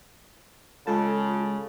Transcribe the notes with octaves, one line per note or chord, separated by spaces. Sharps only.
C#3 G#3 F4 A4 A5